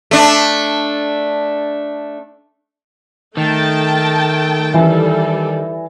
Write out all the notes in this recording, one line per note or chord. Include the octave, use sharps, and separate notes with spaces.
A3 D4
D#3 A3 G5 A5
E3 G3 A4